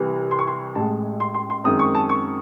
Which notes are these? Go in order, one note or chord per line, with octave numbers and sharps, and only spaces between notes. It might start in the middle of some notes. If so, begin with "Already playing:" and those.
Already playing: C2 C3 E3
C6
C#6
C6
A1 A2 G#3 A5
C6
C6
C6
F#2 D#3 G#3 C4 D#6
C#6
A5
C#6